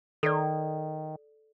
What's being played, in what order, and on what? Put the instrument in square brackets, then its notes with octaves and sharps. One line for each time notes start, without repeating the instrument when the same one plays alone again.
[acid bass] D#3 [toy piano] A4 D5